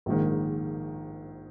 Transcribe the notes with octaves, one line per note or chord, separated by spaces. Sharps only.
A#1 G#2 D#3